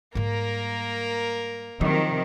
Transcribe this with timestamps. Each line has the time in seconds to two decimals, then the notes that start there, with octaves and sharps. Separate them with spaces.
0.15 G#2 G3 A#3 A#4
1.81 C3 D#3 F3 F#3